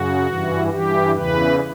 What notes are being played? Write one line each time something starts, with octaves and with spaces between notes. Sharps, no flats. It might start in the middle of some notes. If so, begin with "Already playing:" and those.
Already playing: F#2 C#3 F#4
G2 E3
G2 E3 G4
E2 C#3 E3 B4